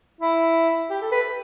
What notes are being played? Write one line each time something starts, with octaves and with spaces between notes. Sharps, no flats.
E4
G4
A4
B4